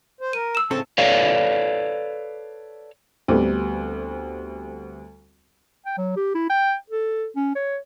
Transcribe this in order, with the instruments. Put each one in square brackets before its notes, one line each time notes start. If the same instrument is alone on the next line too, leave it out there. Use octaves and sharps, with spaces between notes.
[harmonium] C5
[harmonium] A#4 [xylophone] D#7
[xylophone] E6 E7
[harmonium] A2 C#3 A5 [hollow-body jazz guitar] C4 C#4 A4
[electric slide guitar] A4 B4 C#5 D5 F5
[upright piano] D2 G3 A3 B3 C4
[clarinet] G5
F#3
G4
E4
G5
A4
C#4
C#5